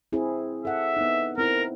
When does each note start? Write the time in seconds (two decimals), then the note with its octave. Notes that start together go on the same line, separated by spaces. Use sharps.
0.12 C4 E4 G#4
0.65 A4 E5 F#5
0.97 B3 D#4
1.38 C4 E4 A#4